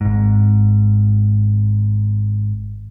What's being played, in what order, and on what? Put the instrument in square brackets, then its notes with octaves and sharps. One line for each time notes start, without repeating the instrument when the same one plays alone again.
[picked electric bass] G#1 G#2